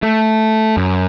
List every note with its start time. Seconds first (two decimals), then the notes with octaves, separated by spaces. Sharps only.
0.03 A3
0.77 F#2